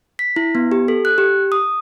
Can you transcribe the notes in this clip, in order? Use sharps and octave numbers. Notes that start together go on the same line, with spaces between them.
B6
E4
B3
G4
A4
F#6
G4
D#6